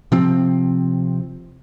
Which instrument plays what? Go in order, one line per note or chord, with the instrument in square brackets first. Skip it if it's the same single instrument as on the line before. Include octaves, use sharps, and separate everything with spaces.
[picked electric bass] C3 F3 C4